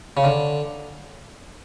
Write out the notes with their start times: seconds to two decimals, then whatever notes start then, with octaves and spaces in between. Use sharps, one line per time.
0.17 C#3
0.24 D3